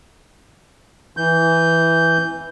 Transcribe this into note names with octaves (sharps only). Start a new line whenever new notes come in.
E3 G6